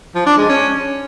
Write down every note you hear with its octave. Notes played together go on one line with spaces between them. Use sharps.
F3
D4
G#3
C#4